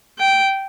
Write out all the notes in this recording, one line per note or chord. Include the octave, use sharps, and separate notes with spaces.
G5